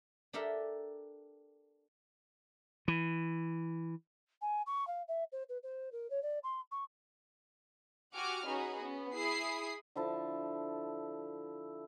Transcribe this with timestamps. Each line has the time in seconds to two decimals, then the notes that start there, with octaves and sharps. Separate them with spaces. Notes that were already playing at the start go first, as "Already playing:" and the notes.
0.33 D4 G4 A4 A#4 E5
2.88 E3
4.41 G#5
4.66 C#6
4.87 F5
5.08 E5
5.32 C5
5.49 B4
5.63 C5
5.92 A#4
6.10 C#5
6.22 D5
6.44 C6
6.72 C#6
8.14 F#4 G4 F#5 G#5 D6 F6
8.46 C#4 D#4 F#4 G#4 B4
8.81 B3 C#4
9.14 E4 G#4 B5 D#6 C7
9.95 D3 F3 E4 A5